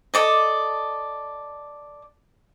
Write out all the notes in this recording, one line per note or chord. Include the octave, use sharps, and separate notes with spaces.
A4 D5 D#5